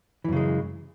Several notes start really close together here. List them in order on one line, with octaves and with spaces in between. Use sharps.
E3 F#2 C#3 G#3